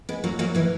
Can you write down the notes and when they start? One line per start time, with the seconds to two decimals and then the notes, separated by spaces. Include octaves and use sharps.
0.09 G#3 B3
0.24 F#3 A#3
0.39 F#3 A#3
0.55 E3 G#3